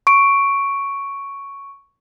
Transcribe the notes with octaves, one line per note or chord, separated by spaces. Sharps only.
C#6 D7